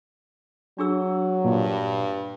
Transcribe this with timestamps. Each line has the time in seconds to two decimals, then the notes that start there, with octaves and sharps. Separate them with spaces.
0.78 F#3 D4 G#4 E6
1.44 G2 A#2